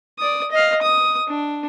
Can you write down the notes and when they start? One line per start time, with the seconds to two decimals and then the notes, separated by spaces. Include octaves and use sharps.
0.19 D5 D#6
0.51 D#5 F5
0.82 D#6
1.28 D4